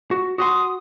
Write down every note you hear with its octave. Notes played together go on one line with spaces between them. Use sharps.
F#4
F#4 F#5 C6 D#6